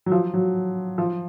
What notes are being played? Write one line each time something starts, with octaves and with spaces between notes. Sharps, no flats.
F#3
F3
F#3
F3